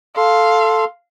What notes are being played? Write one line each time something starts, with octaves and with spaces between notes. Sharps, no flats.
A4 F5 C6